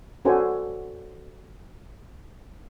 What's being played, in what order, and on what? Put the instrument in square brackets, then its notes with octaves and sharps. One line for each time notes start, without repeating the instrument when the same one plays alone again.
[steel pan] C#4 F#4 A4 C5 D5 G#5